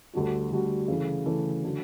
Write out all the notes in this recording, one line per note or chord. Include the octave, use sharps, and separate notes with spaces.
D2 D3 G3 D4 F#4
D2 D3 G3 D4 F#4
C#3 E3 A3
C#3 E3 A3
D3 F#3